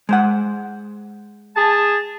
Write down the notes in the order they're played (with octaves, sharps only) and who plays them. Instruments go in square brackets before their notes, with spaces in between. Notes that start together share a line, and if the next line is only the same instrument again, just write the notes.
[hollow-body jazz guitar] G#3 C5 F#5
[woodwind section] G#4 G#5 A5